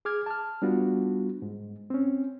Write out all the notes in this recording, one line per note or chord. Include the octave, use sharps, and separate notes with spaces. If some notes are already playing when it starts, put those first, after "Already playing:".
G#4 D6 F6 G#6
A5 F6
G3 B3 D4 F4 F#4
G#2
C4 C#4